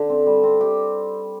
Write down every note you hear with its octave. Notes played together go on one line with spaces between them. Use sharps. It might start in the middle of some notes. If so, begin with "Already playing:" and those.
Already playing: D3
C4
G3
C4
G4